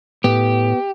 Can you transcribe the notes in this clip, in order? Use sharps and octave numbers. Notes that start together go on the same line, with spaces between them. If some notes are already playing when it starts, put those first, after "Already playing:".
A2 B3 G4